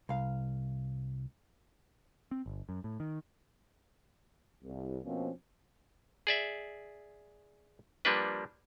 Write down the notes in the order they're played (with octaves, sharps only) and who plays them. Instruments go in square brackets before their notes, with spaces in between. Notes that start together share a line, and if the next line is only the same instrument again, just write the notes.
[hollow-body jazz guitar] C2 F5
[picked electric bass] C4
G1
F#2
A2
D#3
[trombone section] C2
B2 F3 A#3 C4 C#4
[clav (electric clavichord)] G#4 D5 E5
F3 G3 A#3 D4 B4